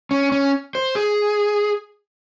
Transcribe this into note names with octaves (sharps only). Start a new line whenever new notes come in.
C#4
C#4
C5
G#4